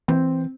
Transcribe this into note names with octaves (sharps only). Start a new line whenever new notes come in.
E3 C4